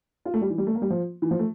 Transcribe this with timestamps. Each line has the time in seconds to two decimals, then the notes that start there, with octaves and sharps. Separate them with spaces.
0.25 F4
0.34 A3
0.41 G3
0.50 E3
0.58 G3
0.67 A3
0.75 A#3
0.82 G3
0.90 F3
1.22 E3
1.31 F3
1.39 A3